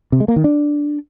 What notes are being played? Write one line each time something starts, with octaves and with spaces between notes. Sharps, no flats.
C3
G#3
A#3
D#3
D4